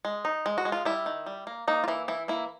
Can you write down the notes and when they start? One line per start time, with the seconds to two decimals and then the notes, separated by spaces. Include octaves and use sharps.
0.05 G#3
0.25 D#4
0.46 G#3
0.58 F#4
0.65 G#3
0.72 F4
0.85 G3 E4
1.06 D#3
1.26 G3
1.47 A#3
1.68 A#3 D#4
1.84 F4
1.88 E3 E4
2.08 E3 E4
2.28 A#3 E4